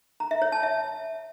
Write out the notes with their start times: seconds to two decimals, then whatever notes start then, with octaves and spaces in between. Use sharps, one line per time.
0.20 A#5
0.31 E5
0.42 C#5
0.52 A5
0.63 E5